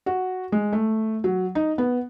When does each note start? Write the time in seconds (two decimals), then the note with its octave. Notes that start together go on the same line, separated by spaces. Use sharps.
0.06 F#4
0.52 G#3
0.73 A3
1.24 F#3
1.55 D#4
1.78 B3